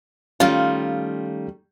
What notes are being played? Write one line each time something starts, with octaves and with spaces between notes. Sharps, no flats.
D#3 G3 A3 C#4 F4 F5